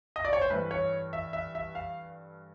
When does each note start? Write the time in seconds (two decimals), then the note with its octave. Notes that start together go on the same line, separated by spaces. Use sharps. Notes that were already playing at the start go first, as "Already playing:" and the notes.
0.16 D#5
0.25 D5
0.33 C#5
0.41 C5
0.50 G2 E3 A3 B4
0.71 C#5
1.13 E5
1.33 E5
1.55 E5
1.75 F5